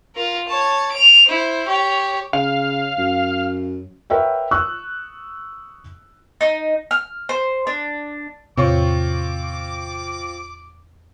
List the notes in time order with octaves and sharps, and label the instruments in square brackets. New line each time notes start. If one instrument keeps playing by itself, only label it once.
[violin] F4 A#4
C#5 A5
D7 F7
E4 C5
G4 C#5
[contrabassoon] C#3 [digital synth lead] F5
[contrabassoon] F#2
[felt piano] A#4 B4 C#5 E5 F#5 G5
C#6 D#6 E6 F#6
[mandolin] D#4
F6
C5
D4
[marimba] E2 A2 C#5 [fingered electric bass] C3 [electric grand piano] C4 F4 C#6 [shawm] D6